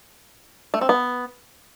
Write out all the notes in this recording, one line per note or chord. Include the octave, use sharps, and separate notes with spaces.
A3
C4
B3